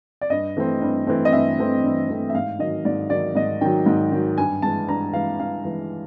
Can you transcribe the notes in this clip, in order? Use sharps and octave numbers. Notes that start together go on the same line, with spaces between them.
D5
G2 D#5
E3 A3 C4
G2
E3 A3 C4
D#5
G2 E5
E3 A3 C4
G2
E3 A3 C4
E5
G#2 F5
D#3 F#3 D#5
G#2 D5
D#3 F#3 D5
G#2 D#5
D#3 F#3 G5
G#2
D#3 F#3
G2 G#5
E3 G#3 A5
G2 A#5
E3 G#3 F5
G2 F5
E3 G#3